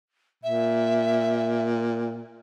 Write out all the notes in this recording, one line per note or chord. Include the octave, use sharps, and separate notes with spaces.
A#2 E5